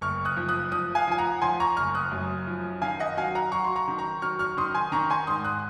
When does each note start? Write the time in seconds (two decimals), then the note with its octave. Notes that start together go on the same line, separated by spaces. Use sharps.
0.01 F#1 C#6 F6
0.25 D#6 F#6
0.37 F3
0.49 D#6 F#6
0.72 F3 D#6 F#6
0.95 F5 G#5
1.07 F3 G#5
1.18 F#5 A#5
1.42 F3 G#5 C6
1.60 A#5 C#6
1.77 F#1 C#6 F6
1.95 D#6 F#6
2.12 F#2
2.47 F3
2.82 D#3 F5 G#5
3.00 D#5 F#5
3.17 F#3 F5 G#5
3.35 F#5 A#5
3.52 F#3 A#5 C#6
3.64 C6
3.76 A#5 C#6
3.88 D#3
3.98 A#5 C#6
4.22 F#3 C#6 F6
4.39 C#6 F6
4.57 D#3 C6 D#6
4.74 G#5 C6
4.92 D#3 A#5 C#6
5.10 G#5 C6
5.27 G#2 C6 D#6
5.44 D#6 F#6